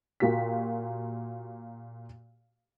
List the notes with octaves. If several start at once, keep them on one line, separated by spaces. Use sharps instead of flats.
A#2 A#3 F#4 G4 B6